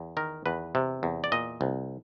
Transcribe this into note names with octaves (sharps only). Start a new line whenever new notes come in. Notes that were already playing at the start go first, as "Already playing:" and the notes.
Already playing: E2
D#3 A#4
E2 B4
C3
E2
D5
A#2 D#5
C2